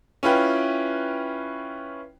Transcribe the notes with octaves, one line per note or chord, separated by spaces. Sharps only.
C#4 E4 F4 B4 G5